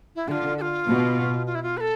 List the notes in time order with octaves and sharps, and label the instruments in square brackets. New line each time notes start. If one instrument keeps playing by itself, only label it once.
[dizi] E4
[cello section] D3 [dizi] A4
[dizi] F4
A4
F4
[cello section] B2
[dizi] F4
E4
F4
B4
A4